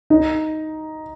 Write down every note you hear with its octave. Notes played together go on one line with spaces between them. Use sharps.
D#4